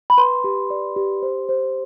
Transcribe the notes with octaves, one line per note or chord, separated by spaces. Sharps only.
B5
B4 C6
G4
D5
G4
C5
C5